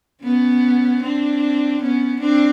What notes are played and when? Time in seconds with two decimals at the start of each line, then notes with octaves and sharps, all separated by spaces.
0.23 B3 C#4
1.03 C4 D4
1.82 B3 C#4
2.20 C4 D4